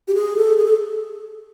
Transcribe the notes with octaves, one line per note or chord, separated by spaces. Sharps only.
G4
G#4
A4
G#4
A4